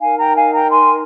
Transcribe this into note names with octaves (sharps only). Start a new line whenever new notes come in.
D#4 A#4 F5 G#5
G5 A#5
F5 G#5
G5 A#5
G#5 C6